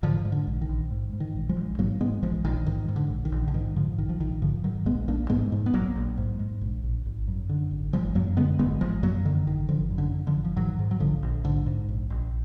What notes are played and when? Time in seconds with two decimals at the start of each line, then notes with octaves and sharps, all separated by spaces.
0.03 G#2 D3 F3
0.25 G#2
0.32 D3
0.47 A#1
0.62 D#3
0.69 A#1
0.91 G#2
1.13 G#2
1.20 D#3
1.35 A#1
1.49 F3 G#3
1.56 A#1
1.78 G#2 F#3 A#3
2.00 G#2 G#3 B3
2.22 A#1 F3 G#3
2.44 A#1 D#3
2.66 G#2 D#3
2.88 G#2
2.96 D3
3.10 A#1
3.25 D#3
3.32 A#1
3.48 D3
3.54 G#2 D#3
3.76 G#2 D3 F3
3.98 A#1 D#3
4.09 F3
4.20 A#1 D#3
4.42 G#2 D3 F3
4.64 G#2 D#3 F#3
4.86 A#1 G#3 B3
5.08 A#1 A#3 D4
5.30 G#2 G#3 B3
5.52 G#2
5.66 B3
5.74 A#1 F#3 A#3
5.95 A#1
6.17 G#2
6.39 G#2
6.61 A#1
6.83 A#1
7.05 G#1
7.28 F#2
7.49 D3
7.71 G#1
7.93 G#1 F3 G#3
8.15 F#2 F#3 A#3
8.37 D3 G#3 B3
8.59 G#1 G#3 B3
8.81 G#1 F3 G#3
9.03 F#2 F#3 A#3
9.25 D3 D#3
9.46 G#1 D#3
9.68 G#1 D3 F3
9.90 F#2
9.98 D3
10.12 D3
10.27 D3 F3
10.34 G#1
10.45 F3
10.56 G#2 D#3 F#3
10.79 G#2
10.91 F#3
11.00 A#1 D3 F3
11.23 A#1
11.44 G#2 D3
11.66 G#2
11.89 A#1
12.10 A#1